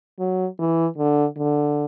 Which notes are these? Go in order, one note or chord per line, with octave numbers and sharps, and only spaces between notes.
F#3
E3
D3
D3